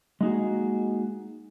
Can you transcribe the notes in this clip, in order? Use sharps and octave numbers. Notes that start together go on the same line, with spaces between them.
G#3 A#3 D#4 F#4 G#4